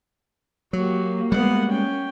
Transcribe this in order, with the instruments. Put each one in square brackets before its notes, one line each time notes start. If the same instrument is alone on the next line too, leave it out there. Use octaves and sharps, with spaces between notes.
[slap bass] F#3 [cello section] A#3 [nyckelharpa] F#4 G4
[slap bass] G3 G#3 [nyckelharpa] B3 F#5
[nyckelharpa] C#4 G5